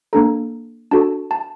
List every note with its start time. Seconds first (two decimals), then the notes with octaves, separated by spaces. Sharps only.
0.13 A#3 D4 A4 A#5
0.91 D4 F#4 A4 A5
1.31 A5